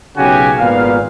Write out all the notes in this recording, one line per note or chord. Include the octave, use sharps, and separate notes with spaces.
B1 C#3 C#4 F#4 G4 G#5
G#1 A#2 B3 F5